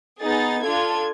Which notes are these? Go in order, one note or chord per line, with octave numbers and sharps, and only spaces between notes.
B3 D#4 G#4 A6
D4 F4 A4 G#6